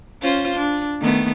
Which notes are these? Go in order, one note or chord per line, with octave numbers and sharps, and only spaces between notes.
C#4 F4 C5
D4
D#3 A3 B3